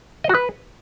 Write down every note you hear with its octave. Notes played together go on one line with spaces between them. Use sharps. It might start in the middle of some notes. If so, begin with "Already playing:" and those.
D#5
F#4
B4